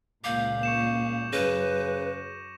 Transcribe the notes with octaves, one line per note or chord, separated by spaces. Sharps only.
C#2 A#2 F5 D6 G6 F#7
C#6 C#7 E7
F#2 C#3 B4 A#6 D#7